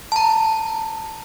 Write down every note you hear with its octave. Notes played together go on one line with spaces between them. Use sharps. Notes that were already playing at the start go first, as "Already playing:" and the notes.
A5 A#5